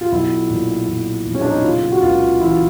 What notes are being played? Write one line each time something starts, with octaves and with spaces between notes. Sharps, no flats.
F4
B1 E4
A#2
A#2
B1
C#4
D4
D#4
E4
C#3 F4
F#4
C#2 F4
E3 E4
F4